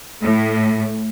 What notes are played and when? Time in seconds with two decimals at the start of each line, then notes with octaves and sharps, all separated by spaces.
0.23 A2